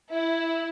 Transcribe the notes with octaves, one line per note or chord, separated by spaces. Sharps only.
E4